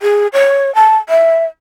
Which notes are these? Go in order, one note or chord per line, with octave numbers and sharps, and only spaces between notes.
G#4
C#5
A5
E5